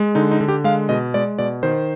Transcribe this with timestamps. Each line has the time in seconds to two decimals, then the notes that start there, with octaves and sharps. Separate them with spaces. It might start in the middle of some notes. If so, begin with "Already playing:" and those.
Already playing: G#3
0.15 D3 D#4
0.31 D#4
0.41 D3
0.48 G4
0.64 G#3 F5
0.89 B2 D#5
1.14 G#3 D5
1.39 B2 D5
1.63 D#3 C5